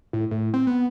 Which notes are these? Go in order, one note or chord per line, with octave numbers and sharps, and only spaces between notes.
A2
A2
C4
B3